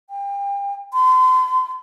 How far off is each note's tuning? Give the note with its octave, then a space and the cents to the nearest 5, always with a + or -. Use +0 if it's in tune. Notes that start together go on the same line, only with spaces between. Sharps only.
G5 +35
C6 -35